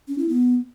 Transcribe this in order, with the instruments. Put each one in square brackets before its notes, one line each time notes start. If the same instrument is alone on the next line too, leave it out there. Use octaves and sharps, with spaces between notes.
[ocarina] C#4
E4
B3